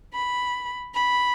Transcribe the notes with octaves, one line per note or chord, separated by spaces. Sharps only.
B5
B5